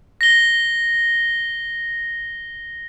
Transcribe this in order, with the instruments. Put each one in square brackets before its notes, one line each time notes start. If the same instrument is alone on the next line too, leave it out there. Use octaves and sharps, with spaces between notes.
[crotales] A#6 G7